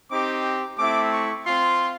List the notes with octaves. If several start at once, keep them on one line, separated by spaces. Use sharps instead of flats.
C4 D#4 G4 D6
A3 C4 E4 D6
C#6
C4 F4 C6